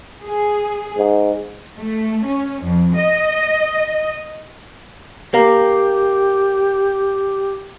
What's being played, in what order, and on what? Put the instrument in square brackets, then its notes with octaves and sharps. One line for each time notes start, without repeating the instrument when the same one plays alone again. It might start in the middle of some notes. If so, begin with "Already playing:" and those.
[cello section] G#4
[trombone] G#2
[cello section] A3
C#4
F2
D#5
[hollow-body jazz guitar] A#3 [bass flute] G4